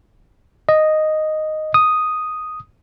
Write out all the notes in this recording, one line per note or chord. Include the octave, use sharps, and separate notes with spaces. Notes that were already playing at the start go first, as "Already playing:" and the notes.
D#5
D#6